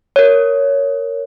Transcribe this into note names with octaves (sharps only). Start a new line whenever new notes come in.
A#4 C#5